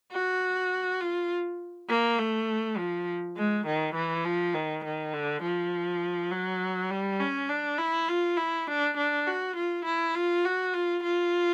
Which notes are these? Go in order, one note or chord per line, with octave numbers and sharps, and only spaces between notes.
F#4
F4
A#3
A3
F3
G#3
D#3
E3
F3
D#3
D#3
D3
F3
F#3
G3
C#4
D4
E4
F4
E4
D4
D4
F#4
F4
E4
F4
F#4
F4
F4